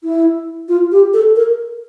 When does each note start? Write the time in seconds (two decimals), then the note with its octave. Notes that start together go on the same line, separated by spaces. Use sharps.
0.04 E4
0.69 F4
0.92 G4
1.13 A4
1.36 A#4